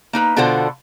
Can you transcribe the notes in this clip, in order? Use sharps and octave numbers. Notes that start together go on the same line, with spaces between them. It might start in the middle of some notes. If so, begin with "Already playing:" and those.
A#3 D#4 B4
B2 D3 F4 A4 C5 F#5